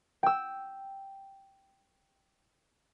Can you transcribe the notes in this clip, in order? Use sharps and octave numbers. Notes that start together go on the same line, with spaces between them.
G5 E6